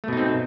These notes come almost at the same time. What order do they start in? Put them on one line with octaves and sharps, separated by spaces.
A3 B2 D#4 C4